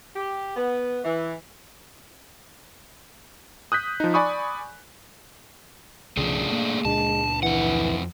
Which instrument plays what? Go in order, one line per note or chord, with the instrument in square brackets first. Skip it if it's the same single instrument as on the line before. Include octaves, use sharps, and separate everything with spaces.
[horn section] G4
B3
E3
[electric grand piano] D#6 F#6 G6 B6
F3 D#4
D5 G#5 B5 C#6 D#6
[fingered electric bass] C2 C#3 F3 [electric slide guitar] A3 D4 G#4
[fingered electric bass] A#3
[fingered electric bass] C#2 A#2 D4 [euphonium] G#3 [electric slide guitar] A5
[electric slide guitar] F2 F#5 [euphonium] E3